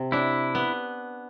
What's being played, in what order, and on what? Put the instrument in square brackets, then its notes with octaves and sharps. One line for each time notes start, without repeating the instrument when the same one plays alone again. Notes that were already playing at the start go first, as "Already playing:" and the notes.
Already playing: [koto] C3
[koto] D4 [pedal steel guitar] E4
[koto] B3